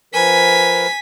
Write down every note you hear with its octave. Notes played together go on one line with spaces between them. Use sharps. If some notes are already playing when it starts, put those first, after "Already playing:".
F3 A#4 B4 G#5 B6